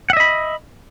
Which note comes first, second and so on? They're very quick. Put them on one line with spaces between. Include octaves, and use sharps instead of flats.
F#5 E5 D#5 B5